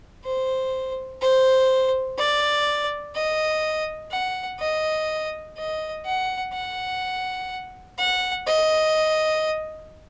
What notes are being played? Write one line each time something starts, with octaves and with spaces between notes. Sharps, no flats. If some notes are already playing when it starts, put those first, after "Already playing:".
C5
C5
D5
D#5
F#5
D#5
D#5
F#5
F#5
F#5
D#5